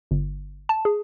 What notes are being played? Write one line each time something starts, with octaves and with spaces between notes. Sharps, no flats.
G1
A5
G#4